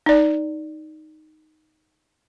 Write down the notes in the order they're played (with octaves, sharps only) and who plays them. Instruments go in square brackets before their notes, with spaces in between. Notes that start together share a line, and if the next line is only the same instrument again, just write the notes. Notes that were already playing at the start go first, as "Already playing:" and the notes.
[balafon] D#4 D5